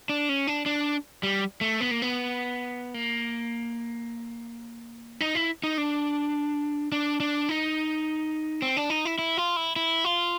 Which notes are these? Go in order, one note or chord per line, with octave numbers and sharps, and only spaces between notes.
D4
C#4
D4
D4
G3
A3
B3
A#3
B3
A#3
D#4
E4
D#4
D4
D4
D4
D#4
C4
D4
D#4
E4
E4
F4
E4
E4
F4